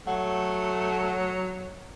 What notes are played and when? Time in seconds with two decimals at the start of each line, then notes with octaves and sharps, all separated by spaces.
0.07 F#3 A3 F#5